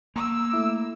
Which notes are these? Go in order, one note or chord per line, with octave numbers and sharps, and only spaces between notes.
A#3 E6
A3 E4 D6